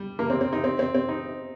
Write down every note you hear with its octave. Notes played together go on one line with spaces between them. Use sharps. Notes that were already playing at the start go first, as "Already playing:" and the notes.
Already playing: G3
A#3
C4
C4
D#4
C4
C4
C4
D#4